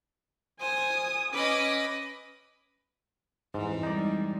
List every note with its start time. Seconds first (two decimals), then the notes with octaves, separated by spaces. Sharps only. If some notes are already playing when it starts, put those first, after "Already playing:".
0.60 C5 G#5 D#6
1.33 C#4 B4 D#5 D6
3.54 F2 G#2 E3
3.83 G3 G#3 D#4 D5